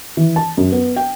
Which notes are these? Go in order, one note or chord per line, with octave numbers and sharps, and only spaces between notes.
E3
A5
F#2
B3
G5